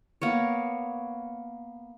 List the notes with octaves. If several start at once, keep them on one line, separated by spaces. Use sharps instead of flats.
A#3 B3 C#5